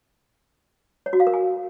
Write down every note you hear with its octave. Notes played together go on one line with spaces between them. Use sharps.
C#5
F#4
F5
A#4
G#5